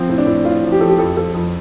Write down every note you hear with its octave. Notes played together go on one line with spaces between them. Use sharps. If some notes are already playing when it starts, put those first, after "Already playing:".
Already playing: F3 C4
A2
D4
A2
A2 F4
F3
G4
F3 A4
G4
F2 A4
F3 A4
F2